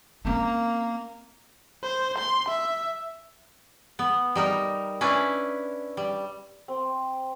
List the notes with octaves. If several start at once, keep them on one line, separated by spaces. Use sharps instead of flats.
A#3 C4 C#4
C5
C6
E5
B3
G3 D#4 A#4
C#4 D4 E4 B4
G3
C4